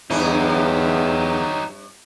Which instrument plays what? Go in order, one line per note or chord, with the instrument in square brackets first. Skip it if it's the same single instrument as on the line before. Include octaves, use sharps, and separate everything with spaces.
[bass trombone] E2 [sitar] G2 C#4 E4 [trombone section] F#3 [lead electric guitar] D#4 G4